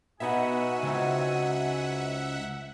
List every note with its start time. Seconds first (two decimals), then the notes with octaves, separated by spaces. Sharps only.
0.20 B2 B3 D#4 F#4 E5 F#5 G#5
0.84 C#2 C4 D#4